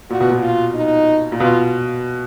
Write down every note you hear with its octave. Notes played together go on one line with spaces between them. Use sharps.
A#2 F#4
B2
A#2
F4
D#4
A#2
B2 F4